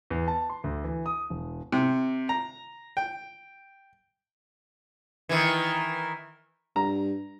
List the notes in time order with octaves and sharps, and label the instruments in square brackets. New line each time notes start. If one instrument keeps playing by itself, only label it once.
[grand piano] E2
A5
C6
D2
E3
D#6
E1
[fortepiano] C3
A#5
G5
[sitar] D#3 E3
[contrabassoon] G2 [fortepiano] A#5